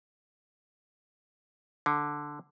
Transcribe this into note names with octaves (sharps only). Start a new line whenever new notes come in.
D3